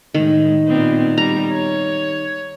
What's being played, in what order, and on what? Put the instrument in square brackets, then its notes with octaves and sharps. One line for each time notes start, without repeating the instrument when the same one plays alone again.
[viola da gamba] A2 G#3 [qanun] D#3
[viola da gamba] A#2 B3 C4
[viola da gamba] G3 [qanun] A#5
[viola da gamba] C#5